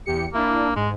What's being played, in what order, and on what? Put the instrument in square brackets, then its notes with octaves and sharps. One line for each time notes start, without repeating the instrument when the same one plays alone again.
[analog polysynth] E2 G4 C#7
[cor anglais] A#3 [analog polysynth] D4 E4
[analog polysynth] G#2 [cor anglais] G#3